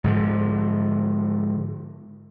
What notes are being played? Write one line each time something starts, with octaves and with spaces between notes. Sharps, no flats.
G#2 D3 F3